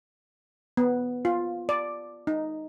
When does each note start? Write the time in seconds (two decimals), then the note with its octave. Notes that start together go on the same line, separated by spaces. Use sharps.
0.77 B3
1.25 F4
1.69 D5
2.27 D#4